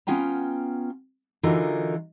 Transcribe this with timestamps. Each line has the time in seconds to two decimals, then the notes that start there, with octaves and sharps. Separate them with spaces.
0.07 B3 C#4 F4 G5 A#5
1.43 D3 E3 F#3 D#4 F4 A#4